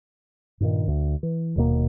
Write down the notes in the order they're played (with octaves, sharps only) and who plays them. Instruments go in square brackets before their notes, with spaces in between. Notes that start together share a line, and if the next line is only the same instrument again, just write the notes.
[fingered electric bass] G2 A#2 D#3
D2
E3
D#1 D#2 B2 A#3